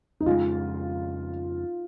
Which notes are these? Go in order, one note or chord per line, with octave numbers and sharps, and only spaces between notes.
D#4
F2 C#3 G#3 F4